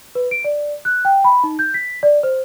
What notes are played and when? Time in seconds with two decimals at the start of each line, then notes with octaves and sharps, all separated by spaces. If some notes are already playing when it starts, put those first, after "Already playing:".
0.15 B4
0.31 D7
0.44 D5
0.85 F#6
1.05 G5
1.24 B5
1.44 D#4
1.59 G6
1.74 B6
2.03 D5
2.23 C5